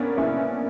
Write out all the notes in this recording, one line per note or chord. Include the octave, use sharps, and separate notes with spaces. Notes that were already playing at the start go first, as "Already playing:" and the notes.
Already playing: A#3 B3 C#4 D4
C#4 E4